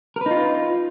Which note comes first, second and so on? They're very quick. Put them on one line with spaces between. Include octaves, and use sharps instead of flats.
A#4 B4 D#4 F4